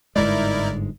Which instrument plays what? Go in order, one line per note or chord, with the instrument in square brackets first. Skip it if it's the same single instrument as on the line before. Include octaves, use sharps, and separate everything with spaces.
[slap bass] G1 G#2 G#3 [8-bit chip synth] D#4 E4 A#4 [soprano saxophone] D5